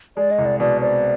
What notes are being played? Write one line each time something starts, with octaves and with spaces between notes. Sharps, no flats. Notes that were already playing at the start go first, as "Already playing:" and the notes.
G#3 D5
D#5
C2
D5
B2 D5
C4 D5